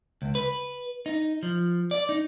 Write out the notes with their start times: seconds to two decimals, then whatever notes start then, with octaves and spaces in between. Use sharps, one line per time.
0.22 C#2
0.35 B4
1.06 D#4
1.43 F3
1.91 D5
2.09 D#4